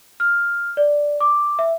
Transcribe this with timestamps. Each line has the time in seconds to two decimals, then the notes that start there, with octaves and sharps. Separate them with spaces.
0.20 F6
0.77 D5
1.20 D6
1.59 E5